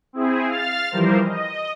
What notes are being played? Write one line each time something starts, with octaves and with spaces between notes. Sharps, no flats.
C4 E4 G#4
F5 F6 A6
E3 F3 G3 A#4 C5
D#5